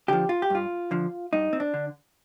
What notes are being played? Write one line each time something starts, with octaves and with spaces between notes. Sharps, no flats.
D3 F3 G4
F4
G4
G2 F4
D3 F3
G2 D#4
C4
D4
D3